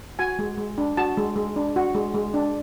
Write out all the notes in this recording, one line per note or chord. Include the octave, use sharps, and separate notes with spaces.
F#4 G#5
G#3
G#3
D4
F#4 A5
G#3
G#3
D4
F#4
G#3
G#3
D4